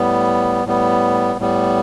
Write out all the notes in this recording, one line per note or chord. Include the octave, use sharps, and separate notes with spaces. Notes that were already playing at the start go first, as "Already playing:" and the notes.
Already playing: A2 G3 B3
A2 G3 B3
A2 G3 B3